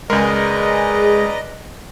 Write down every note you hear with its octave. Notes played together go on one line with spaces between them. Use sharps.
C#2 G#3 A#4 B4 D5 D#5 A#5